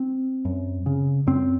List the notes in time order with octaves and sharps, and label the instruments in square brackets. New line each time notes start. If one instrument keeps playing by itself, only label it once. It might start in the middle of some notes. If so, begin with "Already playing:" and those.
Already playing: [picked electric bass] C4
F#2
C#3
F#2 C4